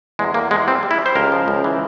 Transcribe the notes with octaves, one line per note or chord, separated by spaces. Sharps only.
E2 G#3
E2 A#3
E2 G#3
G3 C4
G3
E4
G3
C5
C#2 A#4
F3
C#2
E3